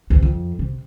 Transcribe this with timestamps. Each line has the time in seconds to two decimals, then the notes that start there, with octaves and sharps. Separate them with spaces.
0.10 A1 D2
0.22 F2
0.59 C3